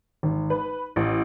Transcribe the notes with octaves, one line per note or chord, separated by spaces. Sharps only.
G#1
B4
A1